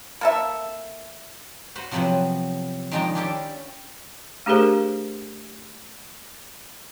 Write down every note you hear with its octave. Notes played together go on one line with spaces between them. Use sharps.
A#3 A4 E5
F#4 B4 C5
C3 F3 F#3 B3 C4 B4
D#3 F3 G#3 D4 G5 A#5
C#4 D4 E4 G4 A4 G5
A3 D4 G4 G#4 A#4 C5